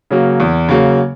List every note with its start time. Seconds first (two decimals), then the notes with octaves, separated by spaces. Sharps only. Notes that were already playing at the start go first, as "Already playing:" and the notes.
0.11 C#3 F#3 A#3
0.40 E2
0.68 C#3 F#3 A#3